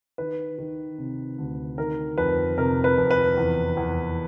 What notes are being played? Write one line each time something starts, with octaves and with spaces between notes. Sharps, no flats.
D#3 B4
D#3
C3
D2
D#3 A#4
F2 B4
C3 A#4
B4
F2
B4
E2
E2